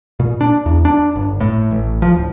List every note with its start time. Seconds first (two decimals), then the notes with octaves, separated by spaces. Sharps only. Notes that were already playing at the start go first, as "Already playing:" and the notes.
0.20 A#2
0.41 D4
0.66 E2
0.85 D4
1.16 G1
1.41 A2
1.71 A1
2.02 F3
2.14 D1